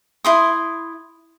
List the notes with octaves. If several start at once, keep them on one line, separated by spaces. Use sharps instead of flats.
E4 C6 D#6